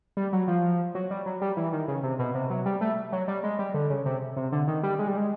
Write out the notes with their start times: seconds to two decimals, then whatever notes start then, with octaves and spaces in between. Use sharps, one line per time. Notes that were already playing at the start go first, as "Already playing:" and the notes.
0.17 G3
0.33 F#3
0.48 F3
0.95 F#3
1.11 G3
1.26 F#3
1.41 G3
1.57 E3
1.72 D#3
1.88 C#3
2.03 C3
2.19 B2
2.35 C3
2.50 F#3
2.66 G3
2.81 A3
3.12 F#3
3.28 G3
3.44 G#3
3.59 G3
3.74 D3
3.90 C#3
4.06 C3
4.37 C3
4.52 D3
4.68 D#3
4.83 G3
4.99 G#3
5.08 G3
5.17 G#3